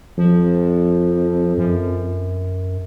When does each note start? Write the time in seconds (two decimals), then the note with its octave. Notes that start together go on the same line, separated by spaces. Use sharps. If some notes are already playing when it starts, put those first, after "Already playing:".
0.18 F2 F3
1.58 F#2